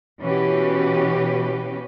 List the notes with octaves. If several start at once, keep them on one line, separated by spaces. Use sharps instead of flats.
B2 E3 C#4 F#4 G4 B4